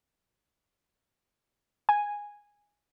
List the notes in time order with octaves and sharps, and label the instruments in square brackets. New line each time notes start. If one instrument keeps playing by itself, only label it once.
[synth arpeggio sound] G#5